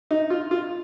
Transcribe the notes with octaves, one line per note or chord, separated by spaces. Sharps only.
D#4
F4
F4